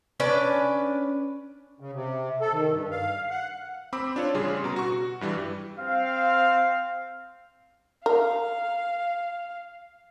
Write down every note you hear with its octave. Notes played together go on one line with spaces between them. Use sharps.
C#4 D4 B4 D5
C#3
C3
A4
D#3
G2
F5
F#5
C4 B5 D6 E6
D4 F4 C#5
A1 C#3 G3 G#4 C6
B2 A#5
F#4 C#6
G2 E3 G3
C4 F5
A#4 F5